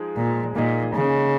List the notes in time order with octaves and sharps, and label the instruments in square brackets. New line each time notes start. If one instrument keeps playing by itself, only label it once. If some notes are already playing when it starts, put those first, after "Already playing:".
Already playing: [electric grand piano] F3 G#3 D#4 G#4
[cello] A#2
[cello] A#2 [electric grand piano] A#3 D#4 G#4 D#5
[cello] C#3